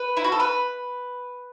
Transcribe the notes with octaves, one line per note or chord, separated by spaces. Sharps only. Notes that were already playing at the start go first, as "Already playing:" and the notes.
Already playing: B4
E4
F#4
A4
B4